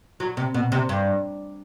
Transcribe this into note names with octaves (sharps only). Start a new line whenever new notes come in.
F#3
C3
B2
C3
G2